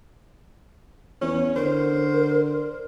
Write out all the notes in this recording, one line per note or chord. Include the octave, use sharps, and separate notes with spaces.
E2 C#4
D3 A#4 C5